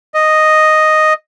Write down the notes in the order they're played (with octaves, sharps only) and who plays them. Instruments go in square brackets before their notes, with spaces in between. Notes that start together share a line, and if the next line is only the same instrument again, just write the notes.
[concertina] D#5